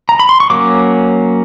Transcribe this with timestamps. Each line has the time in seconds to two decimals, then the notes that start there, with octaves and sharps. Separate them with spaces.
0.09 A#5
0.19 B5
0.29 C6
0.40 C#6
0.50 F#3 A#3 C#4 D6